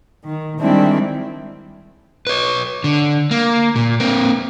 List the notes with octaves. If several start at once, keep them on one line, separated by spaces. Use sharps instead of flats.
D#3
D#3 G3 G#3 C4 D4 E4
B4 C#5
D3
A#3
A#2
A#3 C4